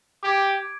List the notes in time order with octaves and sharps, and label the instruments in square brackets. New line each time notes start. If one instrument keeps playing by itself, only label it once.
[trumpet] G4 [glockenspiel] D6 G#6 D7